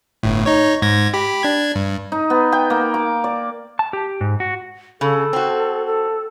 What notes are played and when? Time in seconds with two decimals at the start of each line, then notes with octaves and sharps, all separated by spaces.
0.23 G1 A2
0.46 D#4 C#5
0.82 G#2 G#6 A#6
1.14 G4 B5
1.43 D4 G#6
1.75 G2
2.12 D#4
2.30 B3
2.53 G5
2.70 A#3
2.94 D6
3.24 D5
3.79 A5
3.93 G4
4.21 G#2
4.40 F#4
5.01 C#3 A4
5.33 C4 F#4
5.86 A4